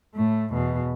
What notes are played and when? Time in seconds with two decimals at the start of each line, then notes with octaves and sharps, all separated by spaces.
0.14 A2 A3
0.53 E2 B2